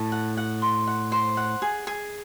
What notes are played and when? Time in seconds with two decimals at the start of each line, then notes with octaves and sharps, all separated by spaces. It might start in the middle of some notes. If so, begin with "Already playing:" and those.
Already playing: A2 A5
0.12 F#5
0.37 F#5
0.62 C6
0.87 F#5
1.12 C5
1.37 F#5
1.62 G#4
1.87 G#4